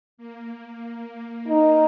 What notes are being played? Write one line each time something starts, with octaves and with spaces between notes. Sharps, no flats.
A#3
A#3 D#4